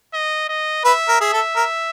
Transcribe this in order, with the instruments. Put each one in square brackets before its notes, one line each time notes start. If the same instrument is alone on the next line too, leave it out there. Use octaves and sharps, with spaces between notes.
[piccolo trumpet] D#5
D#5
[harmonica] B4 [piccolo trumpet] E5
[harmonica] A#4
[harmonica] G#4 [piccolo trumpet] E5
[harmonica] A4
A#4